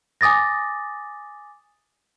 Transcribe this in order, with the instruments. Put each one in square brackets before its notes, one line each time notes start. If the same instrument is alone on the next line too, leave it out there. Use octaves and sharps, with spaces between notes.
[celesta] G#5 D6 D#6 A6 A#6